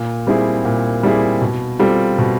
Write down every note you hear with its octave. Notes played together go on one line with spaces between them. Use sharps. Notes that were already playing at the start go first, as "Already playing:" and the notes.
Already playing: A#2
G3 C4 E4 G#4
A#2
G3 C4 E4 G#4
B2
G3 C4 F4 A4
B2